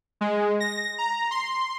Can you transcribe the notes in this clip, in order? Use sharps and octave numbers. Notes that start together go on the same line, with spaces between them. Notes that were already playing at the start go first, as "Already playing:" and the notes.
G#3
A#6
A#5
C6